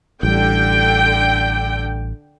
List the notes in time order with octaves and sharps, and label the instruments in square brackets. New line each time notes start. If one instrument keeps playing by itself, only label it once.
[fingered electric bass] A1 G3 [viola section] D3 G5